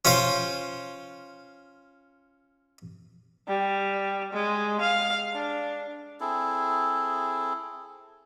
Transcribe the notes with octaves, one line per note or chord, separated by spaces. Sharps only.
C#4 F4 C5 F5
G3
G#3
F5
D4
C4 E4 G#4 A4